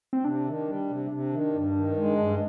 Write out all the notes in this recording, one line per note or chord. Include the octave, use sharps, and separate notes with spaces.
C4
C3 D4
D#3
G3
C3
C3
D#3
G2
D#3
G#3
G2